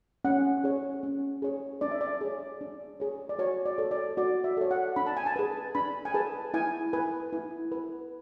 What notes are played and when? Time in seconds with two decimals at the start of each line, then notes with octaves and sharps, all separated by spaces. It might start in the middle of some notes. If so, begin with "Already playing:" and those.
0.25 C#4 F#5
0.64 G#4 C#5
1.03 C#4
1.42 G#4 C#5
1.81 D4 D5
1.91 E5
2.01 D5
2.21 G#4 C#5
2.61 D4
3.00 G#4 C#5
3.29 D5
3.39 F#4 C#5
3.66 D5
3.78 A4 C#5
3.91 D5
4.17 F#4 D5
4.44 E5
4.57 A4 C#5
4.71 F#5
4.96 D4 B5
5.07 A5
5.17 G#5
5.26 A5
5.36 G#4 B4
5.75 D4 B5
6.05 G#5
6.14 G#4 B4 A5
6.54 E4 G#5
6.93 B4 G#5
7.33 E4
7.72 B4